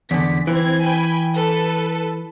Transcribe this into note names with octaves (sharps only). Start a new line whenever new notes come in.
E2 D3 B6
E3 C4 G#6
G5 G#5 B5
A4 B4